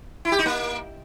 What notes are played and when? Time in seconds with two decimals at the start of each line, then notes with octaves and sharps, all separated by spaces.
0.25 E4
0.32 G4
0.39 D#4
0.46 A#3